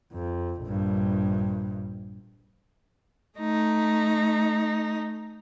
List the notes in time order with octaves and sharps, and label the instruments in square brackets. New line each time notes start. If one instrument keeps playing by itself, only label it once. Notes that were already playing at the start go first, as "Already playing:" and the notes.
[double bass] F2
A#1 G2
[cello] A3 D#4